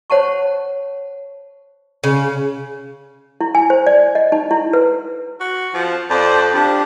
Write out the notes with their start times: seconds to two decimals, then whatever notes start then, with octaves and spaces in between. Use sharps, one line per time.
0.10 C5 C#5 F#5 A5 C#6
2.04 C#3
3.41 E4
3.55 G#5
3.70 C5
3.87 D5
4.15 D#5
4.32 D#4
4.51 E4
4.73 B4
5.41 F#4
5.74 F3
6.10 F2 C5 D5
6.55 F3 D4 G4